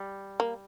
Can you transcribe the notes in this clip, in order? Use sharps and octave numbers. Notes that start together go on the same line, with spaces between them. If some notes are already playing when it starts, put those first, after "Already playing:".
Already playing: G3
A#3